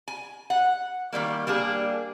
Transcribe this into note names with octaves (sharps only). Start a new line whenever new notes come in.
G#5
F#5
D#3 E3 G3 A#3
G3 A#3 D4 G#4